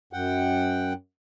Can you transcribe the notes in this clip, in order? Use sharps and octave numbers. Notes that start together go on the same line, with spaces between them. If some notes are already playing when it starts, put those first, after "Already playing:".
F#2 F#5 G5